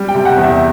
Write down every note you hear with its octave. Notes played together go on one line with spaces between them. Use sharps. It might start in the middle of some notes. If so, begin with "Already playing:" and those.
Already playing: G3
G5
C3
F#5
E2
E5